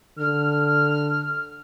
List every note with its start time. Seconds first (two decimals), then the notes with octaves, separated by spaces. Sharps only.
0.19 D3 F6